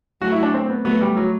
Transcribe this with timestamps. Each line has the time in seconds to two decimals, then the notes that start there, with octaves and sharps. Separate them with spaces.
0.21 F#3 A3 F#4
0.32 E4
0.43 D4
0.54 C4
0.69 B3
0.85 F#3 A3 B3
1.01 G3
1.17 F#3